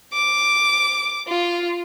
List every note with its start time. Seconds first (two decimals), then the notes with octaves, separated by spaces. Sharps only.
0.13 D6
1.28 F4